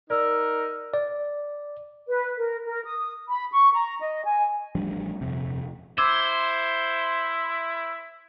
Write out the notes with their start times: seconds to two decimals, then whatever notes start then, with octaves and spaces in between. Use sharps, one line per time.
0.10 D#4 A#4 D5 E6
0.94 D5
2.07 B4
2.39 A#4
2.66 A#4
2.84 D#6
3.29 B5
3.52 C#6
3.74 A#5
4.01 D#5
4.25 G#5
4.75 A1 F3 G3 D4
5.21 D#1 F2 C3
5.98 E4 C5 D6 E6 G#6